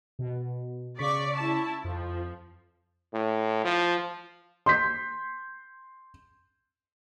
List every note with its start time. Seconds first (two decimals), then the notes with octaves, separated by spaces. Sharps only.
0.19 B2
0.99 C#3 D5 C#6 B6
1.38 E4 A5
1.84 F2 F3
3.13 A2
3.65 F3
4.66 C6 G6 B6